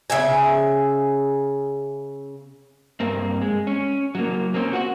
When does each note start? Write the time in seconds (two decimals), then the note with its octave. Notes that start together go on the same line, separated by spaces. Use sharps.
0.10 C#3 E5 G#5
3.00 G2 A#3 C4
3.41 G#3
3.67 C#4
4.15 F#3 A#3
4.54 A#3 C4 C#4 F4 C5
4.73 F#4 F#5